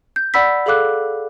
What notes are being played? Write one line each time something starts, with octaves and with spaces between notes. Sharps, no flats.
G6
D5 F#5 B5 E6 B6
G#4 A4 F5 D6 F#6